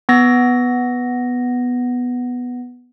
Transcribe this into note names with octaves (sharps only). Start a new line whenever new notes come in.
B3 A#6